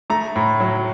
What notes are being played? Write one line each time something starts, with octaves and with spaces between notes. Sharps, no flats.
A3 A#5
A2
F#3